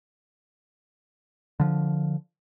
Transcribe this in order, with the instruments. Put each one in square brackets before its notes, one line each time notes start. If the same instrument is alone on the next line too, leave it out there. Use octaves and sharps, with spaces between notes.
[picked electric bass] D3 F3